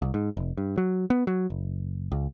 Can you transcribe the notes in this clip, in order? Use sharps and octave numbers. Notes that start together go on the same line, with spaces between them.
C2
G#2
F1
G2
F#3
B3
F#3
F#1
C#2